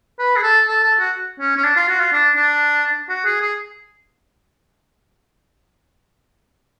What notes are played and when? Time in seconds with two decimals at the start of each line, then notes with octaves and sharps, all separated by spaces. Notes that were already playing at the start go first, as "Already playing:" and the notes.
0.19 B4
0.36 G#4
0.43 A4
0.67 A4
0.83 A4
0.99 F#4
1.40 C#4
1.57 C#4
1.64 D4
1.76 F4
1.88 F#4
2.00 F4
2.13 D4
2.37 D4
3.09 F#4
3.25 G#4
3.41 G#4